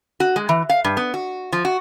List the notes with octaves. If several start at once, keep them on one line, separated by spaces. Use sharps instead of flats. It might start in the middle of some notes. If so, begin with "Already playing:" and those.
F#4
G#3
E3
F5
G2
B3
F#4
F3
F#4